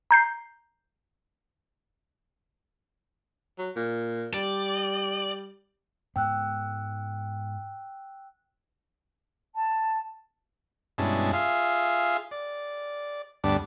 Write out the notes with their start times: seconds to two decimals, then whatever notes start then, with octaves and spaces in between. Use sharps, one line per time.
0.11 A#5 G6 C7
3.59 F#3
3.76 A#2
4.34 G3 D5
6.16 G#2 B3 G5 E6 F#6
9.55 A5
10.98 G2 B2 G#3 C#4 E4 A5
11.33 F4 G#4 E5 F5
12.31 D5
13.44 D2 G2 G3 B3 D4 D6